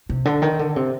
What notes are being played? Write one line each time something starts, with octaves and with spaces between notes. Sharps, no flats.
C3
D3
D#3
D3
C3